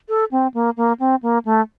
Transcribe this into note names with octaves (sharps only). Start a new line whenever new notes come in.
A4
C4
A#3
A#3
C4
A#3
A3